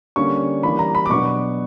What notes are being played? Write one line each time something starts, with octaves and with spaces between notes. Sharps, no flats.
D3 G3 A#3 C#4 C#6
E3 G3 A#3 D4 B5
A#5
B5
D6
B2 F#3 B3 D4 C#6